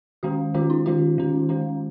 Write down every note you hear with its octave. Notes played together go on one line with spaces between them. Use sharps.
D#3 G#3 C#4 F#4
D#3 G#3 C#4 F4
D#4
D#3 G#3 C#4 F4
D#3 G#3 C#4
D#3 G#3 C#4